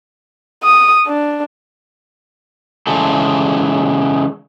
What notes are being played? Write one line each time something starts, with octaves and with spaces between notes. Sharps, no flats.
D#6
D4
C#3 E3 G#3 G#4 A4